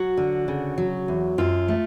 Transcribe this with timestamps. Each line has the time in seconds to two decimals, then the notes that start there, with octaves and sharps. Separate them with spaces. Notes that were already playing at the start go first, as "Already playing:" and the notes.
Already playing: F#3 F#4
0.17 D3
0.48 C#3
0.78 F#3
1.08 E2
1.38 F#2 F4
1.68 A3